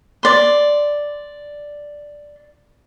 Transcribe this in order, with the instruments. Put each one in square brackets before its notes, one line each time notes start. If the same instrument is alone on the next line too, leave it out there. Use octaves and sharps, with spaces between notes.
[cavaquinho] D5 C6